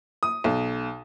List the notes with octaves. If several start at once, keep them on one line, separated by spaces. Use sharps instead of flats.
D#6
B1